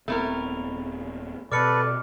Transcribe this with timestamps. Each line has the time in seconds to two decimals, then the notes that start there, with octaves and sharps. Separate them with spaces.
0.08 D#1 A3 B3 C4 E4 A#4
1.52 B2 C4 A4 B4 D5 D6 F6 C#7